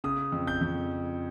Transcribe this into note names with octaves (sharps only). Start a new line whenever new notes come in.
C#3 D#6
F2
G6
F2